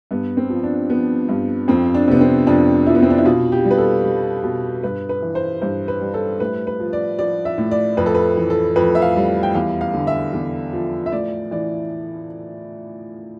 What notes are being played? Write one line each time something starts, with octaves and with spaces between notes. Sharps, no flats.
G2 B3
C4
F3
D4
F3 B3
G2
F2 C4
D4
C3 B3
C4
F2 D4
F3 E4
B3
C4
D4
E4
B2 F4
G4
G3
B4
A4
G3
B2
G2 B4
B4
E3
C5
G2 C5
B4
G3
A4
A2 B4
B4
F3
D5
F3 D5
E5
A2
D5
F2 B4
A4
B4
E3
A4
F2 B4
E5
F5
G3
G5
E2 F5
F5
D3
E5
E2
F3
E5
A2 D5
E3 D5